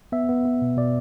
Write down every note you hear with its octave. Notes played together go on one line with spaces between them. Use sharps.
B3 E5
B3
B3
B2
B2 D5